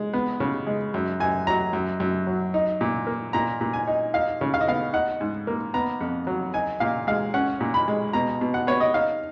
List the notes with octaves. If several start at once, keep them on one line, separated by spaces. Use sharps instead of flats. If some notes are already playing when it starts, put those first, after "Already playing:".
Already playing: G#3
B3
C#3
G#3
F#2
F#2 G#5
F#3 A#5
F#2
F#2
F#3
D#4
A#2
A#3
A#2 A#5
A#2
G#5
D#4
D#4 F5
C#3
F5
D#5
B3 F5
D#4 F#5
G#2
A#3
B3 A#5
F2
F#3
D#4 G#5
A#2 F5
G#3 F5
C#4 F#5
A#2
B5
G#3
B2 A#5
B2
F#5
B3 C#5
D#5
D#4 F5